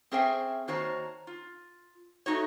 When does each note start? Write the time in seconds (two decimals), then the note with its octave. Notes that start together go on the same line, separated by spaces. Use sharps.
0.11 C4 C#4 G#4 C5 E5 G5
0.68 D#3 A#3 F#4 C5 C#5 A5
1.27 F4
2.26 A3 D#4 F#4 C#5